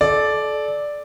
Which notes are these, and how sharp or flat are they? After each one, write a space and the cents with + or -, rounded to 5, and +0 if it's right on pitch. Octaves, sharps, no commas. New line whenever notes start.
A4 -30 D5 +0